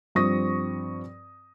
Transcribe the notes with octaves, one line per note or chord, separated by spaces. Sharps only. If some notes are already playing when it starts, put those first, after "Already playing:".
G2 F3 C4 C#6 D#6 A#6